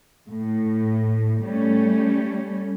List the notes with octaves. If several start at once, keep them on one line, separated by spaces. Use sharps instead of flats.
A2
G3 A3 C#4